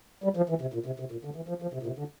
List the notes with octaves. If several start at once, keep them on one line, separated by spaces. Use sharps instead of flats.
G3
F3
E3
C3
A#2
C3
C3
A#2
D3
E3
F3
F3
C3
A#2
C3
D3